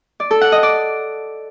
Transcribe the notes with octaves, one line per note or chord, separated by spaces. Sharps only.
D5
A4
F#5
D#5
D5